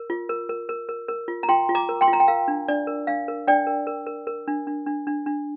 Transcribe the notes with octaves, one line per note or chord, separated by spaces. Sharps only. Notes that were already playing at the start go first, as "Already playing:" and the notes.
Already playing: A#4
F4
A#4
A#4
A#4
A#4
A#4
F4
A#5
F4 G5 C6
F4
A#5 D6
A#4
G5 C6
F4
A#5
G5
A#4 F5
D4
D4 D5
A#4
D4 F5
A#4
D4 D5 G5
A#4
A#4
A#4
A#4
D4
D4
D4
D4
D4